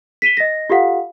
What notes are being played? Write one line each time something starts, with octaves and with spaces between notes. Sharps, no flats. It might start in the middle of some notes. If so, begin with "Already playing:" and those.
B6 D#7 E7 G7
D#5 A#6
F4 G4 A4 F5 F#5